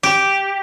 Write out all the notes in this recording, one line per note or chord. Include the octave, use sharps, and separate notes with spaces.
G4